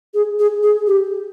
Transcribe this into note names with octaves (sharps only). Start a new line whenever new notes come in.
G#4
G#4
G#4
G4